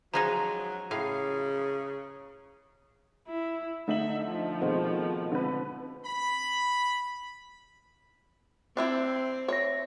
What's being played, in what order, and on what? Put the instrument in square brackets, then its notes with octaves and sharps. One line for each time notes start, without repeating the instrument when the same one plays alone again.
[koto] F3 G#3 D#4 [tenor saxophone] F#3 [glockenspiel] A#5
[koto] A2 F5 [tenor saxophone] C#3
[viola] E4
[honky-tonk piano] D3 D#4 F#7 [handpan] A3 [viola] E5
[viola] F3
[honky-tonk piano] B2 D#3 G#3 [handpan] C4 A4 C5
[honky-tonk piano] D3 B4 [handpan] G#3 C4
[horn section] B5
[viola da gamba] C4 [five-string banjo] D4 E4 G4
[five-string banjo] C#5 [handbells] E5 A#6